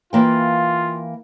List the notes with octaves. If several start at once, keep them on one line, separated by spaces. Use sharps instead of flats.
E3 A#3 F4 G5